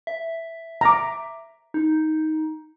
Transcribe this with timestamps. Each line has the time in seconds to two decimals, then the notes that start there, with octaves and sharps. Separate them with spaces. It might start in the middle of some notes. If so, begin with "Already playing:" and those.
0.07 E5
0.81 A#5 D6
1.74 D#4